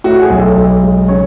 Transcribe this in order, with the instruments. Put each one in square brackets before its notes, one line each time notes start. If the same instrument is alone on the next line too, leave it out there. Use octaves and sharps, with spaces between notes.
[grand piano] A2 F#4
G#4
B1
A4
B1
G#3
C#3 C#5